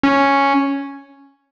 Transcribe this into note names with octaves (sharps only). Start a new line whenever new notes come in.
C#4